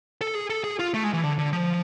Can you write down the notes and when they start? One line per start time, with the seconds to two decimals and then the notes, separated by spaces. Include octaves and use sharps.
0.21 A4
0.35 G#4
0.50 A4
0.64 G#4
0.79 F4
0.94 A3
1.04 G#3
1.13 E3
1.23 D3
1.38 D3
1.53 F3